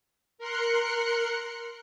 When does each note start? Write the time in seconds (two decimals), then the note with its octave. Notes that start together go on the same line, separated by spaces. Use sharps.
0.38 A#4 C6 F#6 C#7